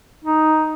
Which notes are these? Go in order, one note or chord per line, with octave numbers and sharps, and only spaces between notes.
D#4